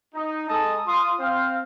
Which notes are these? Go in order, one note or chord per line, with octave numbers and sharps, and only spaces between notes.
D#4
G#3 A4 D#5 A5 A#5 D#6
F4 C6 D#6
C4 C5 F5